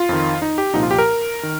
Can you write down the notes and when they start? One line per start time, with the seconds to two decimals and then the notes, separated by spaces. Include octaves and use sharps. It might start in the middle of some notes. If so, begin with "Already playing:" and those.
Already playing: F4
0.09 F2 D#3
0.42 D#4
0.58 G4
0.74 C2 A#2 F3 D#4
0.83 F4
0.91 G4
0.98 A#4
1.43 D#3